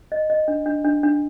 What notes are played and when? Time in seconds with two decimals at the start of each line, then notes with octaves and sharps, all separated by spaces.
0.12 D#5
0.30 D#5
0.48 D4
0.66 D4
0.84 D4
1.03 D4